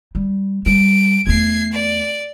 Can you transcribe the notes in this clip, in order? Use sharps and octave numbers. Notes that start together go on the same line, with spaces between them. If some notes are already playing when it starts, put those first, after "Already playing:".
G3
G3 D7
E2 A3 G#6 C7
D5